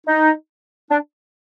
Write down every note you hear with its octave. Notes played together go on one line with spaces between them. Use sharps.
D#4
D4